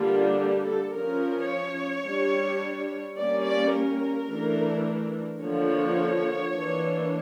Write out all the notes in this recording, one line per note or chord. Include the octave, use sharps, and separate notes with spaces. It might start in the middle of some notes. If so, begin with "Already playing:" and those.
Already playing: D3 G3 A#3 D4 F4
G4
A4
F3 C#4 A#4
C#5
G3 D4
G3 A#3 C#4 D5
D5
A#4
E3 A3 D4
D3 F3 A#3 C#5
E3 A#3 D4